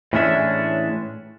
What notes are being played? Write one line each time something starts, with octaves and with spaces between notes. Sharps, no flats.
A2 E3 G#3 C#4 D4 E5